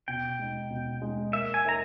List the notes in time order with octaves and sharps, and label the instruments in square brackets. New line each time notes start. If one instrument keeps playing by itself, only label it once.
[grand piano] B2 [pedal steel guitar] G5
[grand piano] G#3 D#4
B2
G#3 D#4
[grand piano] A#3 [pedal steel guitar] E5
[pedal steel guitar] G#5
[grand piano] D#4 A#4 E5 [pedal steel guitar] A#5